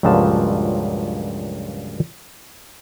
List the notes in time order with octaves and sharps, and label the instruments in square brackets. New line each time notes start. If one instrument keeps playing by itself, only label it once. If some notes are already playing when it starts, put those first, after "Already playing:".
[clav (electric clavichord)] C#2 G2 A#2 F3 F#3 A5